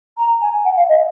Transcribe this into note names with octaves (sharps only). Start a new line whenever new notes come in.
A#5
G#5
F#5
F5
D#5